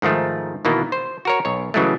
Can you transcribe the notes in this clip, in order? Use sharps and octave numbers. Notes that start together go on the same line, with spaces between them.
G#2 D#3 F3 A3
B2 D#3 E3 A#3 B3
C5
F#4 A#4 C#5
B1 C#5
C#3 E3 F#3 G#3 A3